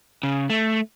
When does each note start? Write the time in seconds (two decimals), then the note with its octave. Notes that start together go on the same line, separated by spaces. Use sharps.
0.23 C#3
0.50 A3